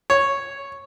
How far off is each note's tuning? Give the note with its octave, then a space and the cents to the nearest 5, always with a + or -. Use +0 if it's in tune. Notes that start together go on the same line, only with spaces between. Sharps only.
C#5 -5